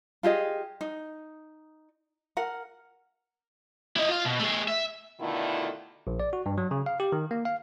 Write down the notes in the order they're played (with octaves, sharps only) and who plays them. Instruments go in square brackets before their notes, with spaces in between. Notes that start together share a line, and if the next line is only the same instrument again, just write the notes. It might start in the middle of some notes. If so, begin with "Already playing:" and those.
[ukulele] F4 G4 G#4 D#5
D#4
A#4 F#5
[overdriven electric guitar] E4 D#5
F4 F5
B2
A3 G#4
E5
[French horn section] B2 D3 D#3 A3 E4 F4
[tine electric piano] A#1
D5
F#4
G2
F#3
C#3
F5
G4
D#3
A#3
F5